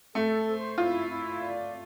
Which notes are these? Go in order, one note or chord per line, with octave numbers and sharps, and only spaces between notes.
A3 A4
C5
E4 F4
E4
D5